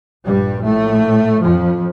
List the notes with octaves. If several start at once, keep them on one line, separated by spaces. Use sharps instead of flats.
A#1 G2 A#2 G3
A2 A3
F2 F3